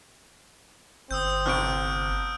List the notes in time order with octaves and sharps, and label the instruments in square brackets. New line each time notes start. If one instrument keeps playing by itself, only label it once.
[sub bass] G1 [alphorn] C4 [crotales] D#6 E6 G6
[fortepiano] A1 C3 C#6 [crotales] F6 D7